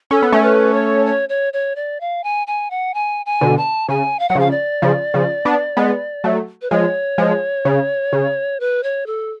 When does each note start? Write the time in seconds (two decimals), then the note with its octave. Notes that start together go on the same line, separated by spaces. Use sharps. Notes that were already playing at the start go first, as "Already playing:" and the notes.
0.11 C#4 A4
0.22 B3
0.32 A3 C#4
0.43 B4
0.74 C#5
1.06 C#5
1.29 C#5
1.53 C#5
1.76 D5
2.00 F5
2.24 G#5
2.47 G#5
2.70 F#5
2.94 G#5
3.26 G#5
3.41 B2 D3
3.57 A5
3.88 C#3 G#5
4.19 F5
4.29 F#3 F#5
4.35 C#3 F3 F5
4.51 D5
4.82 C#3 F3
5.14 C#3 F3
5.45 B3 D4
5.77 G#3 B3
6.24 F#3 A3
6.62 B4
6.71 F3 G#3 C#5
7.18 F3 G#3
7.65 C#3
8.13 C#3
8.60 B4
8.83 C#5
9.06 A4